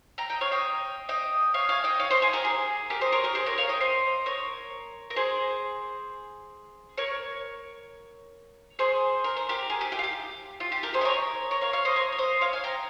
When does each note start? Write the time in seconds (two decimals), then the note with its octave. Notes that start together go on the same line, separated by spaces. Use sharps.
0.18 G5 A#5
0.30 D#5 G5
0.41 C#5 F5
0.52 D#5 G5
1.09 D#5 G5
1.54 C#5 F5
1.69 F5 G#5
1.84 D#5 G5
2.00 C#5 F5
2.11 C5 D#5
2.22 G#4 C5
2.33 G4 A#4
2.45 G#4
2.90 G4 A#4
3.01 C5 D#5
3.12 A#4 C#5
3.24 G4 A#4
3.35 G#4 C5
3.46 A#4 C#5
3.58 C#5 F5
3.69 D#5 G5
3.80 C5 D#5
4.26 A#4 C#5
5.10 A#4
5.16 G#4 C5
6.98 A#4 C#5
8.79 G#4 C5
9.24 A#4
9.37 C5
9.49 G4 A#4
9.70 G#4
9.81 G4
9.92 G4
9.99 F4
10.04 G4
10.60 F4
10.72 G4
10.83 G4 A#4
10.94 G#4 C5
11.01 D#5
11.05 A#4 C#5
11.51 A#4 C#5
11.62 C#5 F5
11.73 C#5 F5
11.85 C5 D#5
11.96 A#4 C#5
12.12 C#5
12.18 C5 D#5
12.41 C#5 F5
12.53 F5 G#5
12.64 G5 A#5